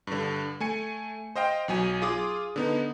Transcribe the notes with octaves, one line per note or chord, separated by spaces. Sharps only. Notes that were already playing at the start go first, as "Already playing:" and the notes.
G2 D3
A3 G#5 C#7
C5 D#5 F5 G5
B1 F#3 G#5
F4 G#4 D6 D#6
D3 B3 D#4